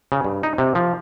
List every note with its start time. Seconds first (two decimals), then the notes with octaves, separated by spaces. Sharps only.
0.12 C#3
0.24 G2
0.43 D#4
0.58 C3
0.75 F3